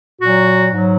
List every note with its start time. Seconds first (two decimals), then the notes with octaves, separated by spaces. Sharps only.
0.20 A#2 F#3 F#4
0.71 G#2 F#3